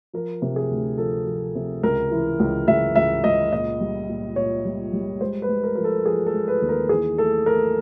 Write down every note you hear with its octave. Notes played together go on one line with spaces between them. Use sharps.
F3 A#4
C3
G#4
D2
F3 A4
F3
C3
C#2 A#4
E3
C#2
C#2 E5
C#2 E5
C#2 D#5
A#2 D#5
G3
A#2
A#2 C#5
G3
G3
G#3 C5
B4
G#3
A#4
F3 A#4
A4
F3 G#4
A4
G#3
B4
D#2
A#4
E3 G#4
A3 A4
A3 A#4